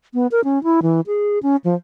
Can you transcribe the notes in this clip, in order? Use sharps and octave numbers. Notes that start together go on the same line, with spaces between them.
B3
A#4
C#4
E4
E3
G#4
C#4
F3